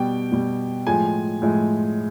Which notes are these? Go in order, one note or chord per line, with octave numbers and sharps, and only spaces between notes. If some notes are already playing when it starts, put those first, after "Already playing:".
Already playing: B2 G3 G5
B2 G3
A2 F3 G#3 G#5
A2 F3 G#3